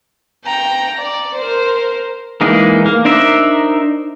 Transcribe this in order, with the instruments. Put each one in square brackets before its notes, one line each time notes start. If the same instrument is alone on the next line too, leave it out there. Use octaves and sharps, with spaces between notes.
[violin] G5 A#5
D5
A#4 C5
[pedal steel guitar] E3 G#3 A#3 D#4 G#4
A#3
D4 D#4 A#4 C5 E5